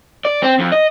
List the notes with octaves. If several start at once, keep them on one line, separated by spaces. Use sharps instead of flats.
D5
C4
F2
D#5